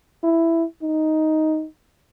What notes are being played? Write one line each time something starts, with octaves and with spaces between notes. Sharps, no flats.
E4
D#4